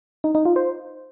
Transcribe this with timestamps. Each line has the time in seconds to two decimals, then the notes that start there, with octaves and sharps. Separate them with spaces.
0.24 D#4
0.35 D#4
0.45 F4
0.56 C5